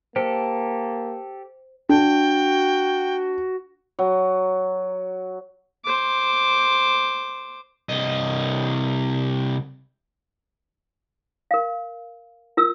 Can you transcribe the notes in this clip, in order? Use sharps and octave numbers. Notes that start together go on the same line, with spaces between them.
A#3 G4 A4 C5
D4 F#4 G5
F#3
C5 D6
C2 D#5
A#4 F5
F4 A#4 E6